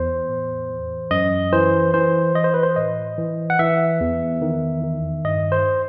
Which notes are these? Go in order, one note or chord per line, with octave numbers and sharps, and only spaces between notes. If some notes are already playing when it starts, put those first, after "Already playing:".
Already playing: E2 C5
A2
E3
F#2 D#5
E3 C5
E3 C5
E3 D#5
C5
B4
C5
A2 D#5
E3
F#5
E3 E5
E2
D#3
D#3
G2 D#5
C5